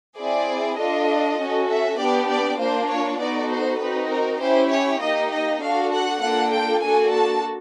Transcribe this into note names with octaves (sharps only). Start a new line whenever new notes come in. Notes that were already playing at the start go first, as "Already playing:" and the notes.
C4 E4 G#4 D5
D4 F4 A4 D#5
C#4 F#4 A4
E5
B3 D4 G4 D5
D5
A#3 D4 F4 C5
C#5
B3 D#4 F#4 A4 D5
C5
C4 D#4 F#4 B4
A#4
C#4 E4 G4 C5
C#5
A#3 D#4 G4 D#5
D#5
D4 F#4 A4 F5
F#5
A#3 D4 F4 A4 F#5
G5
A#3 D4 F#4 A4 G#5
A5